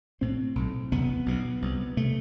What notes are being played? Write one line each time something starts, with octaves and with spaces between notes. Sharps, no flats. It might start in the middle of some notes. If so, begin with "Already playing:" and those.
B1 A2 C4
B1 A2
F#1 E2 C3 B3
B1 B2
C2 C3
C3 A3